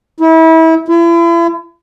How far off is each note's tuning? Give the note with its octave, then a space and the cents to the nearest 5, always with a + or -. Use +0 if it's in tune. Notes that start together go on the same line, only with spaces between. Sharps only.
E4 -30
E4 +40